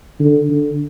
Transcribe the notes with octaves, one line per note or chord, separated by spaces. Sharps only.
D3
D3